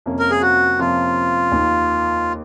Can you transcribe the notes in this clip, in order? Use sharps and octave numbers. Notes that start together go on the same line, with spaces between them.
F2 C3 F3 A#3 C#4
A#4
G#4
F#4
F2 C3 F3 A#3 C#4 F4
D#2 D#3 A#3 D#4